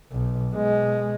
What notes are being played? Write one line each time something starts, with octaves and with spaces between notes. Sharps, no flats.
B1
B2 G#3